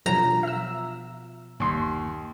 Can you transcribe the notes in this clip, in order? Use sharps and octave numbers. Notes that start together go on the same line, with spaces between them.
B2 F3 F#3 A#5
E5 E6
G1 D#2 C6